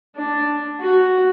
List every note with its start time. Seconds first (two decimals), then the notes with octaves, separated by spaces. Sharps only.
0.16 D4
0.80 F#4